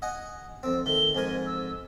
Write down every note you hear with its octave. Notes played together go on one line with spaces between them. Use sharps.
D#5 F#5 G#5
F2 C4 E6
D#3 A3 G7
F2 G#2 A#4 G#5
E6